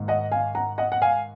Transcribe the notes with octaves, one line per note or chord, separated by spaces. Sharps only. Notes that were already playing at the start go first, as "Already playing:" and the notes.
Already playing: G#2 D#3 A#3
D#5 F#5
F5 G#5
F#5 A#5
D#5 F#5
F#5
F5 G#5